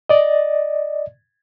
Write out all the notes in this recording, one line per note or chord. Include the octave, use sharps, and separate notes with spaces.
D5 D#5